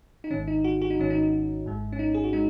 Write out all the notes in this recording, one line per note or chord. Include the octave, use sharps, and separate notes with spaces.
D#4
G#1 G#2 D#3 C#4
D#4
F#4
F#4
D#4
G#1 G#2 D#3 C#4
D#4
G#1 G#2 G#3
C#4
D#4
G#4
F#4
G#3 D#4